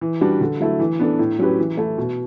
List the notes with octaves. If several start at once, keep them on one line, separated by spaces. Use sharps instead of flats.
E3
G3 D4 F#4 B4
D3
F#3 A3 E4
E3
B3 D4 A4
A2
F#3 C#4 G4 B4
E3
A3 E4
B2